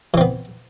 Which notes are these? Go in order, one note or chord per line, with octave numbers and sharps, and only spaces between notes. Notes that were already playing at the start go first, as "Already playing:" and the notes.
E3 B3 C4